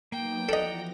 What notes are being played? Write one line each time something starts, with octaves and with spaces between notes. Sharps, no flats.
F#3 A#3 B3 D#4 G5
E3 F3 A4 D5 D#5 F#5 A#5 A#6